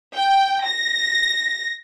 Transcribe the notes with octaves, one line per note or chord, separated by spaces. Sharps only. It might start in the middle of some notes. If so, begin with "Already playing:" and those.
G5
A#6